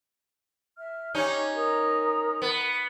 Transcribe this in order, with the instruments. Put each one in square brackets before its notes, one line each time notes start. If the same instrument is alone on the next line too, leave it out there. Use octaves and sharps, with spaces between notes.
[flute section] E5 F6
[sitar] C#4 D#4 [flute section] G4 C#5 C#6
[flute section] A#4 A#5 D#6
[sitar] B3